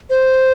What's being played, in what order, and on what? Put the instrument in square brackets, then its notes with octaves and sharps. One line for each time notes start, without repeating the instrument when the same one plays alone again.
[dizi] C5